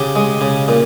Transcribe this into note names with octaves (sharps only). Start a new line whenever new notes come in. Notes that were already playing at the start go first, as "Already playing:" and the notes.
Already playing: C#3 G4
G#3
C#3
A#2